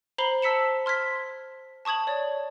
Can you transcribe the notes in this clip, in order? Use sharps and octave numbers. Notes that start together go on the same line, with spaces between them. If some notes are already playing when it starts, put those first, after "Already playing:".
C5 A#5 B5 C7 F#7 G7
A5 E6 B6 C#7 E7
C6 F6 G#6 B6
A5 C#6 D#6 G#6 F#7
C#5 D5